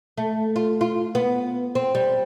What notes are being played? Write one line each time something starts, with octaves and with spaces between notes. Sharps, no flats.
A3
F4
F4
B3
C4
G3